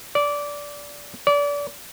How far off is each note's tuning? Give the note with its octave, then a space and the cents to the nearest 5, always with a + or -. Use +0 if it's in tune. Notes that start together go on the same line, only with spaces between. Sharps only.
D5 -15
D5 -30